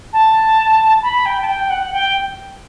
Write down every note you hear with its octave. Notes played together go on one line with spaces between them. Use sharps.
A5
B5
G5
A5
G5
F#5
G5